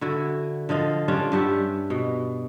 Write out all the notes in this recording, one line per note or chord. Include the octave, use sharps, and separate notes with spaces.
D3 E4 F#4
D3 F3 D#5 F5
G3 C#4 D4 F4
G2 G4 E5 F#5
B2